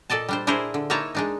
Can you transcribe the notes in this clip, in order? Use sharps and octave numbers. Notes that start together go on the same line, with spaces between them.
A#2 A4 D5 D#5 A5
G3 D4 C5
D4 E4 G#4 A#4 C5
D3
A#3 D#4 E4 C#5 A5 A#5
G#3 D4 D#4